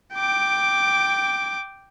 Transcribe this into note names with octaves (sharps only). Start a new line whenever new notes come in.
G5 D6